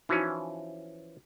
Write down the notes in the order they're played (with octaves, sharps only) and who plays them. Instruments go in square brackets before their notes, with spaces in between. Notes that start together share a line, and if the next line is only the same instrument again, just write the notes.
[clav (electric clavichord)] E3 F3 C#4 [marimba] D#4 E4 F#4